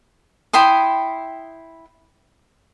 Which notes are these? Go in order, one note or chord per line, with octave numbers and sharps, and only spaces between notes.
E4 G5 C6 D#6